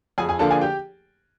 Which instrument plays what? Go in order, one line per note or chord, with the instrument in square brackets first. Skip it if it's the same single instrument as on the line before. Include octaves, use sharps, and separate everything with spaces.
[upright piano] F2 G#4 G#5
G#4 G#5
D3 F3 A#3 D4 A4 A5
G#4 G#5
G4 G5